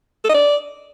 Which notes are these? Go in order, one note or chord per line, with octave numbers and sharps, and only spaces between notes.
A4
D#5
D5